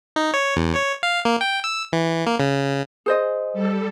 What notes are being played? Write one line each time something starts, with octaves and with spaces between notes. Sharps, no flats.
D#4
C#5
E2
C#5
F5
A#3
G5
E6
E3
A#3
C#3
G#4 C5 D#5
G3 A4